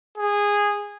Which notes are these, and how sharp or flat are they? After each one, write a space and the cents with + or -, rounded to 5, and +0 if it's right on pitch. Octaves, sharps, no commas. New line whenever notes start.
G#4 -15